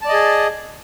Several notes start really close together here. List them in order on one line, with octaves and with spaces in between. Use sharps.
A5 D5 D#5 G#4